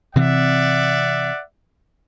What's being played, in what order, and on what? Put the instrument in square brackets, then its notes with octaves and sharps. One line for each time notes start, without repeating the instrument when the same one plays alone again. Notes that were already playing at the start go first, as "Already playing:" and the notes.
[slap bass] C3 E3 C4 [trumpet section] D5 E5 F#5